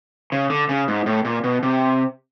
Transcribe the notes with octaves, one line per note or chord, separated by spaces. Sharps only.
C#3
D3
C#3
G#2
A2
A#2
B2
C3